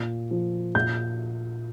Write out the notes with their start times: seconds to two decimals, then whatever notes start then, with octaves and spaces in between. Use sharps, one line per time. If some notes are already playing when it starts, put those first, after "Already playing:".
Already playing: A#2
0.31 F3
0.75 A#2 G6